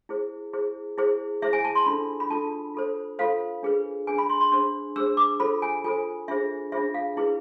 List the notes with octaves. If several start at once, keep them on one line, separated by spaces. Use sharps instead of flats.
E4 G#4 C5
E4 G#4 C5
E4 G#4 C5
E4 G#4 C5 E5
G#5
A5
C6
D4 F4 A4 B5
B5
D4 F4 A4 A5
F4 A4 C5
F4 A4 C5 F5
D4 G#4 B4
D4 G#4 B4 G#5
B5
C6
C6
D4 G#4 C5 C6
D4 G#4 C5 E6
D6
F4 A4 C5 B5
G#5
F4 A4 C5 G#5
D4 F4 G#4 C5 E5
D4 F4 G#4 C5 E5
F5
E4 G#4 B4